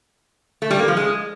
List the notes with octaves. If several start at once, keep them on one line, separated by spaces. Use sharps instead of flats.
A3
G3
A#3
F3
G#3